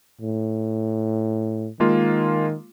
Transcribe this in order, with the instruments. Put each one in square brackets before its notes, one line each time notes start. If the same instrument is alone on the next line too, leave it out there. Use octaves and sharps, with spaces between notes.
[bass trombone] A2
[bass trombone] D#3 [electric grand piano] G#3 A#3 F4